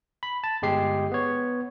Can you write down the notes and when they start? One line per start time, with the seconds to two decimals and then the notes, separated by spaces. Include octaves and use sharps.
0.23 B5
0.44 A5
0.62 G1 G#3 G4 C7
1.11 B3 C#5